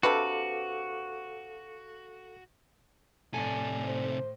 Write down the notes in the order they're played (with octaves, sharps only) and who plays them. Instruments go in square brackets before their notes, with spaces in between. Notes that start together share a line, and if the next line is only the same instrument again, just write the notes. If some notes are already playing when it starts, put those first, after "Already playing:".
[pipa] C3 D4 B4 [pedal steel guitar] F#4 [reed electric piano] A4 F5 D6
[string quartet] A2 [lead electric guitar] C3 A4 [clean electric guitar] D5 G#5
[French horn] C5